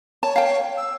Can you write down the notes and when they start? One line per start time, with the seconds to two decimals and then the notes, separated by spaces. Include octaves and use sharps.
0.23 C#5 A5
0.36 F5 G5
0.77 E6